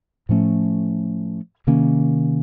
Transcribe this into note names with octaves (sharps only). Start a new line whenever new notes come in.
A2 F3 A3 C#4
C3 D#3 A#3 C#4